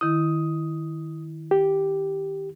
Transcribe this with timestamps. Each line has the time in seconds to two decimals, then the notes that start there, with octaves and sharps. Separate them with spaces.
0.01 D#3 E4 D#6
1.51 G4